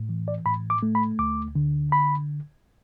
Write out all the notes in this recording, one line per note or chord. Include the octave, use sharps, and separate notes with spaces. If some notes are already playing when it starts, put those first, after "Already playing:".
Already playing: A2
E3
D5
A2 B5
D6
A3
B5
D2 D6
D3
B5